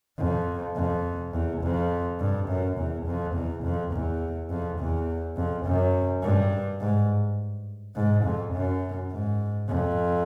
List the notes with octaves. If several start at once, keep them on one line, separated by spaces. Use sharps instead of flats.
F2
F2
E2
F2
G2
F#2
E2
F2
E2
F2
E2
F2
E2
F2
F#2
G2
G#2
G#2
F2
F#2
G#2
F2